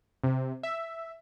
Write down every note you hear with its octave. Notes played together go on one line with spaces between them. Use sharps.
C3
E5